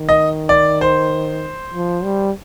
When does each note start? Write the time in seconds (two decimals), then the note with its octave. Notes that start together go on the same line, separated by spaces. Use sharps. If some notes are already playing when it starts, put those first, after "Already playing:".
Already playing: D#3
0.09 D#5
0.49 D5
0.81 C5
1.74 F3
2.04 G3